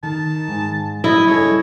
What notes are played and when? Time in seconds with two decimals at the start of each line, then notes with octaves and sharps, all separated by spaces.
0.03 D#3 A5
0.48 G#2
1.04 E4 D#5
1.27 G2 C#3 A4 C#5